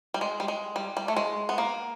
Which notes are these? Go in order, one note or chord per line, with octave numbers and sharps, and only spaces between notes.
G3
G#3
G3
G#3
G3
G3
A3
G#3
B3
A#3